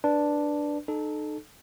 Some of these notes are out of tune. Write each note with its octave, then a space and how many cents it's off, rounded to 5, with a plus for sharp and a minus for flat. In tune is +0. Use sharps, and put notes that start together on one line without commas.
D4 +0 B4 -10
D#4 -35 A4 -20